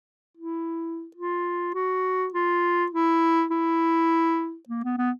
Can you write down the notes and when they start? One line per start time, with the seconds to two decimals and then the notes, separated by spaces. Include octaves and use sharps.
0.37 E4
1.16 F4
1.74 F#4
2.33 F4
2.92 E4
3.51 E4
4.69 A#3
4.84 B3
4.98 B3